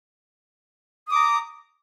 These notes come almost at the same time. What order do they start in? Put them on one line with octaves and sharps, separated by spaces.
D#6 D6 A#5